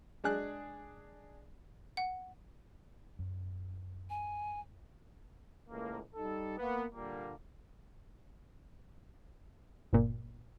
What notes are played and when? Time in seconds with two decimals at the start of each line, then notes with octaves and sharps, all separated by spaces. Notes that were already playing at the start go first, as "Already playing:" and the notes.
0.24 G#3 D4 G#4 F#6
1.97 F#5
3.19 F#2
4.10 G#5
5.69 C#2 A2 A#3
6.15 G3 D#4 A4
6.57 A#3 B3
6.94 A#2 D3 G3 A#3
9.93 G1 A#2